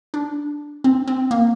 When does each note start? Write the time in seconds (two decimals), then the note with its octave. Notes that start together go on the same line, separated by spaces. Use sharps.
0.14 D4
0.84 C4
1.08 C4
1.31 A#3